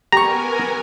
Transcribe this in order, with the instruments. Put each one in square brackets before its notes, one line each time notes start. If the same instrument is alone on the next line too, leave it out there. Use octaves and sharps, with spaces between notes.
[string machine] B3 A#4 G#5 [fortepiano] G4 C#6 [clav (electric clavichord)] A#5